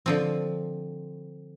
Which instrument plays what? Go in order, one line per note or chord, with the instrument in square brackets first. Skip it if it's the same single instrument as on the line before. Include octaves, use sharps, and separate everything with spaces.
[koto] D3 F3 C4